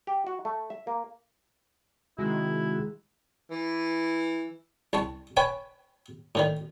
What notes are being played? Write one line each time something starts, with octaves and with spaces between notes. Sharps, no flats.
G4
F#4
A3
E5
A#3
C3 D#3 G#3 E4 F#4
E3
C2 A5 C#6
B4 C#5 G5 G#5
A2 D3 D#3